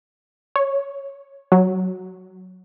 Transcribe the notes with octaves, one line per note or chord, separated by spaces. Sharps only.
C#5
F#3